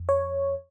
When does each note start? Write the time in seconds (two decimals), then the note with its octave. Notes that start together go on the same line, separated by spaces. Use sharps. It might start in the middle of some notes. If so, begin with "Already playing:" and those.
Already playing: F2
0.09 C#5